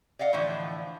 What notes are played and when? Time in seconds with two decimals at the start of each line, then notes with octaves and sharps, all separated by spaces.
0.19 D5 D#5 F5 F#5
0.33 A2 D3 E3 F3